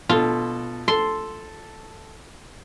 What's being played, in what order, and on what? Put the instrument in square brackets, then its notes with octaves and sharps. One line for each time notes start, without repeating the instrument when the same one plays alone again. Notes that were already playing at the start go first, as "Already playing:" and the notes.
[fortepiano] B2 A4 [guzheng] F4
[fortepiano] A4 [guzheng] C6